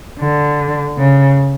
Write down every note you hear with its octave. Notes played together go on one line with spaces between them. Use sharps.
D3
C#3